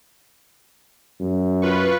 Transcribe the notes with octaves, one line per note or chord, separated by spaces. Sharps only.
F#2
F4 B4 C#6